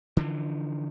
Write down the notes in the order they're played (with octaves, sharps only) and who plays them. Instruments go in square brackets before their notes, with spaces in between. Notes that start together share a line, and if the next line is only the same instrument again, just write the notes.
[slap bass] D3 E3 F3